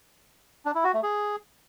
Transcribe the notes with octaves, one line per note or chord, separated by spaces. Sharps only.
D4
E4
F#4
A3
G#4